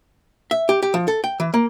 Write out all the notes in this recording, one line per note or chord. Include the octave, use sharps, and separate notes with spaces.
E5
G4
G4
F3
A4
G5
E3
A#3